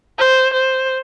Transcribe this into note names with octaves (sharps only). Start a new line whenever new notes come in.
C5
C5